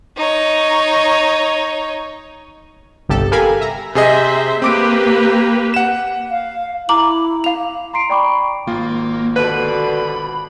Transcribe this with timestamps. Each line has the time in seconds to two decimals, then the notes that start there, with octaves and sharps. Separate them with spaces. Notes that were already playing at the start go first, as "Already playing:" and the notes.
0.16 D#4 C#5
3.09 G1 C2 G4 A4
3.31 G4 A4 A#4 F5 G#5 B5
3.61 E5 A#5
3.95 C3 G#4 C5 D#5 E5
4.62 A#3 C4 G4 B4 D6 D7
5.74 F#5 E7
6.31 F5
6.89 E4 A#5 D6 F#7
7.44 F5 F7
7.93 A#5 C6 C7 D7
8.10 D5 G5 A#5 B5 C#6 D6
8.67 G#1 A#3 F4
9.36 B2 D3 B4 B5